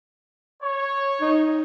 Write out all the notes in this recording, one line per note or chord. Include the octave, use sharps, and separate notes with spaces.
C#5
D#4